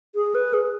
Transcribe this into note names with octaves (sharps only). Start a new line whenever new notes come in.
G#4
B4
G#4